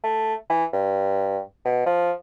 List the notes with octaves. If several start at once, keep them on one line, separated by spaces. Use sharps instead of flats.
A3
E3
G2
B2
F3